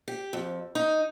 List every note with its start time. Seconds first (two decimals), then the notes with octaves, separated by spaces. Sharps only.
0.08 G4
0.33 F2
0.75 D#4